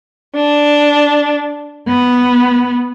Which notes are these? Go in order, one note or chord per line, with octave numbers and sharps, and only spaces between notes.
D4
B3